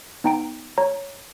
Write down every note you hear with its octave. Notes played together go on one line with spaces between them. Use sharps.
B3 D#4 G5 A#5 D7
C#5 A#5